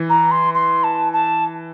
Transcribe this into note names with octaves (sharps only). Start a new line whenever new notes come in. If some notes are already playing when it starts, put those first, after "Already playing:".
Already playing: E3
A#5
C6
C6
A5
A5